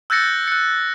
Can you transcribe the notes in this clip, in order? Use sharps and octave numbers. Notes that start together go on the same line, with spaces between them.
E6 F#6 G6 A6 A#6 C#7
F#6 C#7